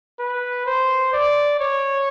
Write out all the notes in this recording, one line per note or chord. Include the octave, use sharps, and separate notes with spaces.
B4
C5
D5
C#5